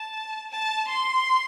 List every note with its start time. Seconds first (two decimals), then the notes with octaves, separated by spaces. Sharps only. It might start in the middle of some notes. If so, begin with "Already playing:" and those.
Already playing: A5
0.50 A5
0.88 C6